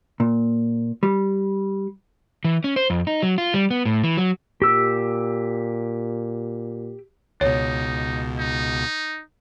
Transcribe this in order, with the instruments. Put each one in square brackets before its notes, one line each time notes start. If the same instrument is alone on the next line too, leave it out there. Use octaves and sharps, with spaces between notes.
[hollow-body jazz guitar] A#2
G3
[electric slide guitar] E3
C#4
C5
F2
D#4
F#3
F4
G3
B3
A2
E3
F#3
[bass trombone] A#2 [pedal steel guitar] G4 E6
[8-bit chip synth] C#2 B2 [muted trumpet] D#4 [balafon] C#5
[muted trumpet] D#4